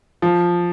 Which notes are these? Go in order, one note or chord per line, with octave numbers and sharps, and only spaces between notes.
F3